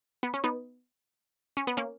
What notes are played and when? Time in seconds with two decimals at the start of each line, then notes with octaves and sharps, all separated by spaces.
0.23 B3
0.34 C#4
0.44 B3 D#4
1.57 C#4
1.67 B3
1.77 A#3 C#4